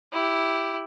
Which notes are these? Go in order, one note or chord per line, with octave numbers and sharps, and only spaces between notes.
E4 G4